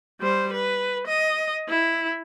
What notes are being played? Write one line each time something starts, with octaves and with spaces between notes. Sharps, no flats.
G3 C5
B4
D#5
E4